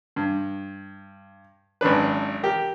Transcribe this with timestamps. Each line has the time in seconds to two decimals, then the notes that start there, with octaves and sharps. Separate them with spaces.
0.16 G2
1.81 G#1 F#2 D4 B4
2.43 G4 A#4